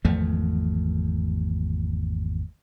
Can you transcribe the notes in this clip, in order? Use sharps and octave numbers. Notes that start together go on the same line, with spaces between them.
G#1 E2 F3 A3